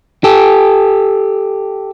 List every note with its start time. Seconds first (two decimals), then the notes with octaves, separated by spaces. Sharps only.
0.24 G4 A4